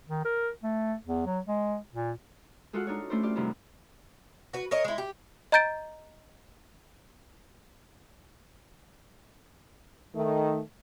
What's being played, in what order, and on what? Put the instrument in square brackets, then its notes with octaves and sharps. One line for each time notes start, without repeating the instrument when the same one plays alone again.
[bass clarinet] D#3
A#4
A3
E2
F#3
G#3
A#2
[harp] G#3 F4 F#4 A4 F#5
D4 D#4 F4 C#5
A3 C#4 D4 E4 C5
F4 G4 D5
F#2 C3 D#3 G3 D4 E4
[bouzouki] F#4 B4
A#4 C#5 D#5
G#3 E4
G4
[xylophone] D#5 A#5 G6 A6 D7
[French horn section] D#3 A3